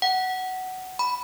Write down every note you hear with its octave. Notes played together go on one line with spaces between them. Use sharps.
F#5
B5